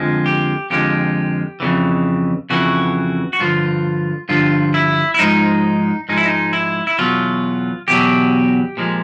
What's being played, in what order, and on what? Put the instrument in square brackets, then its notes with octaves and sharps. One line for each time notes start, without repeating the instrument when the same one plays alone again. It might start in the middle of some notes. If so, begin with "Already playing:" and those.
Already playing: [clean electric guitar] F2 D3 F3 G#3
G4
F2 D3 F3 G#3 G4
F2 C#3 E3
F2 C#3 E3 F#4
F#4
G2 D3 F3 F4
G2 D3 F3 F4
E4
E4
G#2 F3 G#3 D#4
G#2 F3 G#3 D#4
E4
D#4
E4
E4
E2 B2 F#3 F4
E2 B2 F#3 G4
A#2 F3 G#3